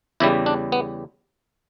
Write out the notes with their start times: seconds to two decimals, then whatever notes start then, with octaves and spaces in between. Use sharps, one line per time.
0.20 E2 C#3 G3 E4
0.46 D4
0.72 B3